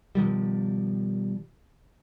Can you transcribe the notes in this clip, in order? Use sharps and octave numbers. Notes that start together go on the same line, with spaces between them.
B2 D#3 F3 G3